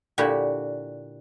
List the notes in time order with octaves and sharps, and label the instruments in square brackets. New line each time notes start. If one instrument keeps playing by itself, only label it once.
[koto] A#2 D3 E4 F#4 G4